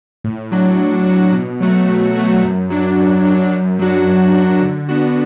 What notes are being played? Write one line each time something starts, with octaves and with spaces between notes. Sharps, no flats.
A2
F#3 D4 F#4
A2
F#3 D4 F#4
B2
F#3 A3 F#4
B2
F#3 A3 F#4
F#2
F#3 D4
F#2
F#3 D4
F#2
F#3 D4 F#4
F#2
F#3 D4 F#4
D3
B3 D4 F#4